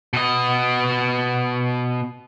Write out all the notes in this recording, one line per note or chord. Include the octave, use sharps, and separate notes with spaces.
B2 D#5